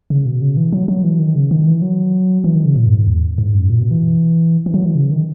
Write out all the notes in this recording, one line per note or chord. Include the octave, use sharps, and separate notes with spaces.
C#3
B2
C#3
E3
F#3
F#3
E3
D#3
C#3
D#3
E3
F#3
E3
D#3
C#3
A#2
F#2
G#2
E2
G#2
F#2
A#2
B2
E3
E3
F#3
E3
C#3
D#3